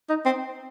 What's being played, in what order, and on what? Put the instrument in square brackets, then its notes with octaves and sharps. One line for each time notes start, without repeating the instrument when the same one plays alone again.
[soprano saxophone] D#4
C4